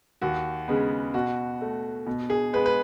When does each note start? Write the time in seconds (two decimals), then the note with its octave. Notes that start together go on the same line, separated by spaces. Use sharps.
0.22 D#2 F#4
0.68 C#3 G#3 B3
1.14 B2 F#4
1.61 A3
2.06 B2
2.30 G#4
2.53 G#3 B3 B4
2.66 B4